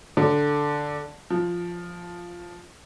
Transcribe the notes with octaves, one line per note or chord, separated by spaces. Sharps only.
D3
F3